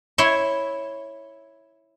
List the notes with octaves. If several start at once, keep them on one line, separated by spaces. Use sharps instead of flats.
E4 C#5 E5 C6